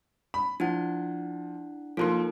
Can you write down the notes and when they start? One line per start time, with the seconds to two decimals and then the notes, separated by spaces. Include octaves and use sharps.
0.34 B5
0.60 F3 D4 E4 F#5
1.97 F3 A#3 D#4 F4 A4 C6